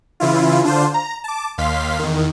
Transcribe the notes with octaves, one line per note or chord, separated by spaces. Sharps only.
C#3 E3 E4 F4
D3 D4 F4 C5
A#5
A5 D6
D#2 F5 C6 B6
E2 D#3